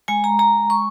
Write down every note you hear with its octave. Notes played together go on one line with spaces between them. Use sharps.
G#3 G#5
A#5
G#3 A#5
G#3 C#6